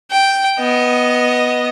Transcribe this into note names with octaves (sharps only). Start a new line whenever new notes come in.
G5
B3 D#5